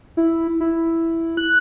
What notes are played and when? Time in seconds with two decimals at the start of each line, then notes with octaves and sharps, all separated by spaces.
0.17 E4
0.60 E4
1.37 F#6